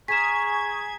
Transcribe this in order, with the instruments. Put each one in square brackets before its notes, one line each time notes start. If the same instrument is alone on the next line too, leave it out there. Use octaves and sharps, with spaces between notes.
[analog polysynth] G#4 G#6 [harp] G#5 A#5 F6 [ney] C#6 [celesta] B6 E7